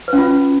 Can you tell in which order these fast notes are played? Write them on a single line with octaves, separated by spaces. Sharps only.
B4 C#4 F4